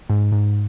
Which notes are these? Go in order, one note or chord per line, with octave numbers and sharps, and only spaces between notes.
G#2
G#2